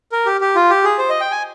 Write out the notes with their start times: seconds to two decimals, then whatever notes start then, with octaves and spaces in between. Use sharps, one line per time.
0.12 A#4
0.26 G4
0.41 G4
0.56 F4
0.70 G4
0.84 G#4
0.99 C5
1.09 D#5
1.21 G5
1.31 G#5